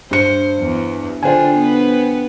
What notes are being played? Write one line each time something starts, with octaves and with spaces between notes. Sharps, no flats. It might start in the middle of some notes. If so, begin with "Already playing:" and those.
G2 C5 C#7
E2
D3 D4 F4 C5 G5 G#5
B3 B4